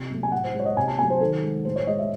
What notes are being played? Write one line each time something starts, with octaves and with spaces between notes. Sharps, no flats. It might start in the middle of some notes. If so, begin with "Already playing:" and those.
Already playing: C3
F#3 A3
G#5
A2 F#5
C5
G#3
C#5
D#5
C3 G#5
A5
F#3 A3 G#5
C5
D#3 A4
G#3
A2 C5
C#5
G#3 D#5
E5